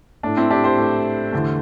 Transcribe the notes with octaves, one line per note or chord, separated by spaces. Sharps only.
A2 A3 D4
C4 E4
D4 G4
G4 C5
A2 A3
E2 D3 A3